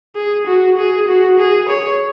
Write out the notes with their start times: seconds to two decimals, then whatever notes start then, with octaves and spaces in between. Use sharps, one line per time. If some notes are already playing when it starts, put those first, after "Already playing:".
0.16 G#4
0.47 F#4
0.77 G#4
1.08 F#4
1.39 G#4
1.69 C#5